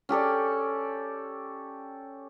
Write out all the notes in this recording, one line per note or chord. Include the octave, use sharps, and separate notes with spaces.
C#4 G4 A4 D5